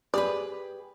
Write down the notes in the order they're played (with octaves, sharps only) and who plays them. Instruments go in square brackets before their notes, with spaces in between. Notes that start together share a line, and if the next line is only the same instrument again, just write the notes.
[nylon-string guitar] G4 G#4 B4 [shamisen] D5